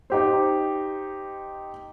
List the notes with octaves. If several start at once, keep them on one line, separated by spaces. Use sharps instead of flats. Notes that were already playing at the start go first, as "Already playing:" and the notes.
D#4 G4 C5